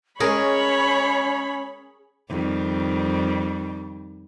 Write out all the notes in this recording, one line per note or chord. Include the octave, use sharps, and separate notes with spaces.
G#3 C#4 G#4 A#4 C#5 B5
F2 D#3 G3